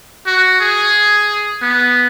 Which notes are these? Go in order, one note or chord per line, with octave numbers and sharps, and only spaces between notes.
F#4
G#4
B3